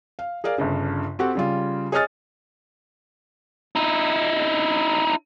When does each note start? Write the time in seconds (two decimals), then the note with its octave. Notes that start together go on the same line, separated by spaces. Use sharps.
0.19 F5
0.44 G#4 A#4 D5 F5
0.58 G1 G2 C#3
1.19 C4 F#4 G4 A4 F#5
1.35 C#3 G3 F4
1.92 G#4 C#5 D#5 D#6 F6 A6
3.76 D#4 E4